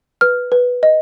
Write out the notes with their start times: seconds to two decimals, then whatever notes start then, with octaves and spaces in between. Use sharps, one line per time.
0.21 B4 F6
0.52 B4
0.83 D#5